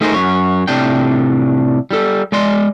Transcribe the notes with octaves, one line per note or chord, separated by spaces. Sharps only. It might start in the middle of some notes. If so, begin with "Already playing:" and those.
A3 D#4 E4 G#4 A#4 C5
F#2 C#5
A2 C3 D4 G5
G3 A4
G#3 D5 C6